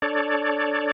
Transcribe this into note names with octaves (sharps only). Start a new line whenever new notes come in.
D4 A4 C#5 D5